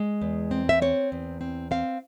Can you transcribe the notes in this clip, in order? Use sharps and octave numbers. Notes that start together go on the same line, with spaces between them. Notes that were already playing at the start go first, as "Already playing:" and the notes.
Already playing: G#3
E2
C4
E5
C4 C#5
E2
C4
C4 F5